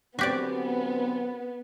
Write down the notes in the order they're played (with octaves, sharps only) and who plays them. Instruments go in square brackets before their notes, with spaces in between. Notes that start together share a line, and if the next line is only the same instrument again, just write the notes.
[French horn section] F#2 D3 C4 [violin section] B3 [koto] F#4 G4 D5